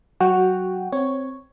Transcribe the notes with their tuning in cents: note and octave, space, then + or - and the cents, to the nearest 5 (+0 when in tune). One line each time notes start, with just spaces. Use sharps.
F#3 +15 F#4 +0 G5 +0
C4 +0 C#5 +0